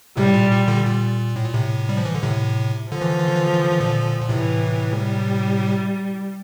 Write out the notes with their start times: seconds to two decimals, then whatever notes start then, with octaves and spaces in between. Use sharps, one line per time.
0.17 A2 C3 G3
0.34 A#2
0.51 A#2
0.68 A#2 D3
0.86 A#2
1.36 A2
1.45 A#2
1.54 A2 C3
1.89 G3
1.97 F3
2.05 E3
2.15 D3
2.23 A2 C3
2.92 D3 F3
3.01 E3
3.09 D3
3.19 E3
3.28 D3
3.36 E3
3.45 D3
3.54 E3
3.63 D3
3.71 E3
3.80 A#2 D3
4.22 A#2
4.29 A2 C3 E3
4.98 G3